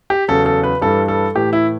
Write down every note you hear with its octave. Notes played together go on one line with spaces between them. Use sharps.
G4
E2 C#3 F#3 A4
A4
B4
G2 E3 G3 A4
A4
A2 E3 A3 G4
E4